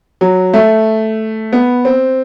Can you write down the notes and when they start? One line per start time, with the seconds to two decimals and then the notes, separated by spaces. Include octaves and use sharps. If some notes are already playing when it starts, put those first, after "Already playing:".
0.21 F#3
0.54 A3
1.53 B3
1.85 C4